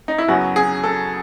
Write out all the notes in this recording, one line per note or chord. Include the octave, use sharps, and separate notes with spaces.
D#4
E4
F#2 C#3 F#3 B3 F#4
G#4
A4